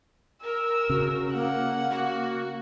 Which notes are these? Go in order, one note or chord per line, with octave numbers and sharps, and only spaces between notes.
A#4 E6
C#3 F#4
A#3 F#5
A#3 F#4